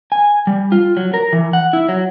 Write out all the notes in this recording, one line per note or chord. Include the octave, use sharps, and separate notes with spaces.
G#5
G3
F4
F#3
A#4
E3
F#5
E4
F#3